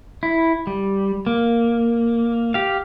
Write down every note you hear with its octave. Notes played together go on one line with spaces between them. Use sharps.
E4
G3
A#3
G4 F5